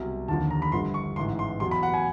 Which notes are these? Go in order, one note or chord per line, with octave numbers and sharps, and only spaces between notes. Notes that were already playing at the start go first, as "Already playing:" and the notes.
Already playing: C2 B2 F#3
D#2 D3 F3 A5
A#5
B5
G1 G2 D3 F3 C6
C#6
A1 G#2 E3 C6
C6
E2 B2 F#3 C6
B5
F#5
G#5